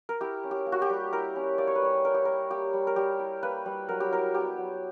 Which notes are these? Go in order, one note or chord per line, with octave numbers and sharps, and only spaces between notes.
A#4
E4 G4
C#4
G4
A#3
F#4
G4
G3
E4 A#4
C#4
A#3 D5
C#5
B4
G3 C#5
G3 A#4
G4
E4 A#4
A#3 G4
G3
A#4
G3 G4
E4
A#3 B4
G3
F#3 A#4
G4
E4 A#4
B3 G4
F#3